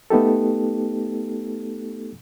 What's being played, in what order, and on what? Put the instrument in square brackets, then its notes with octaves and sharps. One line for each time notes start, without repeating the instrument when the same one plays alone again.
[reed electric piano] A3 B3 D#4 G4 A4